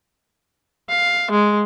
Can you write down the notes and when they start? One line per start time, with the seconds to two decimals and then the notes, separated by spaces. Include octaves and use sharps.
0.89 F5
1.31 G#3